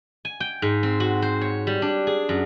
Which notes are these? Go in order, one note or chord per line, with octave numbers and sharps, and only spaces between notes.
G#5
G5
G#2
C4
F#4
C5
C#5
G3
D4
G#4
F#2